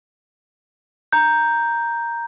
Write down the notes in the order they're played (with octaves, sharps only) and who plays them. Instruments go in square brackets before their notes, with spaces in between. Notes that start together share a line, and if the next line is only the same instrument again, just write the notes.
[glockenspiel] A#5 G6